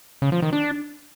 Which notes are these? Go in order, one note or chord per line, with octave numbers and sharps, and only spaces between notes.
C#3
F3
D#3
D4